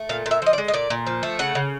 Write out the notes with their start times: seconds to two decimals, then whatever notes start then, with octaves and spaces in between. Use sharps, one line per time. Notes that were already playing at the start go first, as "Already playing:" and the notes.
Already playing: A3
0.09 A#2 F5
0.26 A#2
0.31 E5
0.42 F3 D#5
0.53 D5
0.58 G#3
0.68 D#5
0.74 A#2 D5
0.90 A#2
1.07 F3
1.23 A3
1.39 C#3 F#5
1.55 C#3